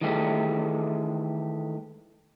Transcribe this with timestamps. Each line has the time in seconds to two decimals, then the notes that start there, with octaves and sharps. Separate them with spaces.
0.01 D#3 E3 G#3 A3 G4